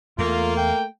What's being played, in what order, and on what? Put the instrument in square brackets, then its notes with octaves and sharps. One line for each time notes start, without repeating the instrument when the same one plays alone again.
[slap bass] E2 [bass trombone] A3 [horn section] A#3 [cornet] F4
[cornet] G5